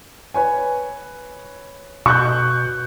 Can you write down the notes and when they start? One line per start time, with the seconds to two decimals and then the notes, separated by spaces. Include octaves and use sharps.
0.34 B4 C#5 G#5
2.06 B2 C#6 F#6 G6